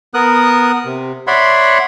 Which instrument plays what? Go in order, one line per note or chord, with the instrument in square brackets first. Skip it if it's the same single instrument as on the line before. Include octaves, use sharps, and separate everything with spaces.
[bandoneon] B3 A#4 D#6 F#6
C3
C#5 D5 E5 F#5 B5 C6